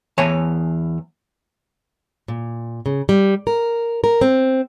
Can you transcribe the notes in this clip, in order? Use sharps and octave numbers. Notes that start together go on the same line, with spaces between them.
E2 E3 C#5 G#5 A5
A#2
C#3
G3
A#4
A#4
C4